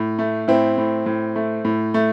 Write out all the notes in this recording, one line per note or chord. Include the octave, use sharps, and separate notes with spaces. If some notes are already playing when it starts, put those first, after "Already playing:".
Already playing: A2
A3
A2 C4 E4
A2
A2
A3
A2
A3